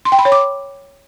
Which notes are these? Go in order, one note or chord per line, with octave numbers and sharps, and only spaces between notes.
C6
G5
B5
C#5
D6